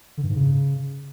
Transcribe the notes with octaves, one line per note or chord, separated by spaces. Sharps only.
D3
G2
G#2
C#3